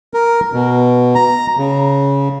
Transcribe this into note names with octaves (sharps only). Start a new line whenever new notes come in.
A#4
B2
A#5
C#3